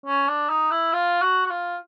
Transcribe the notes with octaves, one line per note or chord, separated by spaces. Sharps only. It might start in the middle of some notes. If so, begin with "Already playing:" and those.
C#4
D4
D#4
E4
F4
F#4
F#4
F4